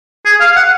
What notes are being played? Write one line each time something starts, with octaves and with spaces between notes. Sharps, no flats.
G#4
F5
F#5